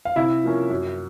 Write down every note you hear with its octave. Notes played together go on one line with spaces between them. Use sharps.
F5
C3 E4 E5
F3 A#3 C#4
F#2